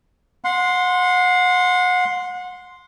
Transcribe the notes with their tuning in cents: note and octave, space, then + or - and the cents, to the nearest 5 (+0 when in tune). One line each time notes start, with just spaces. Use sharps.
F#5 -30 C6 +0